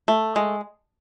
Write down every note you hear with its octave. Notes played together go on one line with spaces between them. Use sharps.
A3
G#3